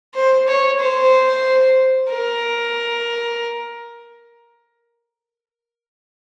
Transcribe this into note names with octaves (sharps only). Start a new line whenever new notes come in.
C5
C#5
C5
A#4